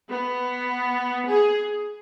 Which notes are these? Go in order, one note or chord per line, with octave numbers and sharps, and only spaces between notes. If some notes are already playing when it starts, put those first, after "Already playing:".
B3
G#4